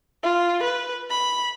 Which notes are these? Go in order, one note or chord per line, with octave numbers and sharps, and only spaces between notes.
F4
B4
B5